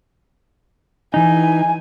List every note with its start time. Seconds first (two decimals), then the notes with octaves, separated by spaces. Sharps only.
1.14 E3 D#4 G#5